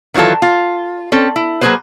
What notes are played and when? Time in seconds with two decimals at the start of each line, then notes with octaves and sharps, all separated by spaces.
0.14 D#3 E3 F#3 F4 A4
0.42 F4
1.12 C4 C#4 A4
1.36 E4
1.61 F#3 A#3 G4 G#4 B4 C5